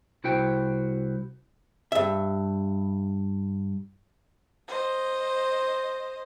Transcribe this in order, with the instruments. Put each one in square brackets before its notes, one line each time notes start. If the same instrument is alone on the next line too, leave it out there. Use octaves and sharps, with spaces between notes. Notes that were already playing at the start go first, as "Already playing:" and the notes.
[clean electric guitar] C2 E4 F#4 C5 G5
[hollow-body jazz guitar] G2 E5
[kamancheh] C5 D#5